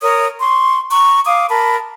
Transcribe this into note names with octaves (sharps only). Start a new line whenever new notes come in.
A#4 C#5 D#6
C6 C#6
A#5 C#6
F5 D6 D#6
A#4 A5 B5